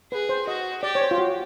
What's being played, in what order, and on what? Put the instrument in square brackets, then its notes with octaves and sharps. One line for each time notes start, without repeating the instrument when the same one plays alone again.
[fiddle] G#4 [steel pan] B4
[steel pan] C5
[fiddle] F#4 [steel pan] D#5
[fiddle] G4 [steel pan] D5
[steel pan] C#5
C5
F4
F#4